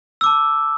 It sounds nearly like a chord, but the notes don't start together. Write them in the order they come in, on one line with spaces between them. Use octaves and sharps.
E6 D6 A5